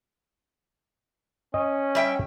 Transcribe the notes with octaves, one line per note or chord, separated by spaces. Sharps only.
C#4 D#5
G3 E5 G5